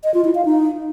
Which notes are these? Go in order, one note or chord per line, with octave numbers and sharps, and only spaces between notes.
D#5
F4
E4
F5
D#4